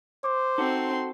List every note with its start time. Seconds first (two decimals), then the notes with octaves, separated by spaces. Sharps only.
0.24 C5 D6
0.58 C4 D#4 F#4 A4 C6